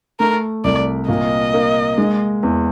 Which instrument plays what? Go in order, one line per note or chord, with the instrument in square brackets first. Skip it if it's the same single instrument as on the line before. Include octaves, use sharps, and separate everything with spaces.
[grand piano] A3 [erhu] A#4
[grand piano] C2 [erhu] D5
[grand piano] A#2 [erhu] D#5
[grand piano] A#3
G#3
E2